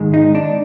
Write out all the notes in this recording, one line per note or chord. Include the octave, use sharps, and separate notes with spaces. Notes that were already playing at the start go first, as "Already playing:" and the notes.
Already playing: G#2 D#3 G#3
D#4
D4